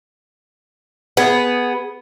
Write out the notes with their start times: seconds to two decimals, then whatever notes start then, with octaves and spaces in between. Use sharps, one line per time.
1.17 B3 G#4